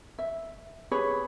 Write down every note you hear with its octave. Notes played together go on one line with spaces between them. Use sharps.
E5
G4 G#4 B4 C#5